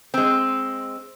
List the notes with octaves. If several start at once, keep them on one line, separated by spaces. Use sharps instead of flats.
G#3 C4